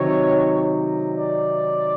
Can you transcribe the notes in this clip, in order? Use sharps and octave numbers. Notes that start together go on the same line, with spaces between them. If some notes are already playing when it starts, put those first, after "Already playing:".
Already playing: C3 D#3 F#3 C#5
D5